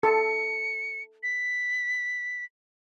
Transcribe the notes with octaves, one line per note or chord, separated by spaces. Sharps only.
A4 C#7
B6